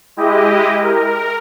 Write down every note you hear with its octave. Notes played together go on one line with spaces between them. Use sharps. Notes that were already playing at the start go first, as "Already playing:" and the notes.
G#3 E4 G4 D#5
A#4